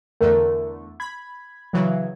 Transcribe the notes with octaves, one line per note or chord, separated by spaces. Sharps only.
E2 D3 A3 A#4
B5 G#6
C#3 E3 F#3